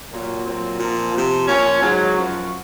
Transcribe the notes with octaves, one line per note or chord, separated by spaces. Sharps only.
A#2 F#3
A#2 F#3 C4
A#2 F3
C3 F3
A#2 F3 C#4
G#2 F#3
F#2 F3 F#4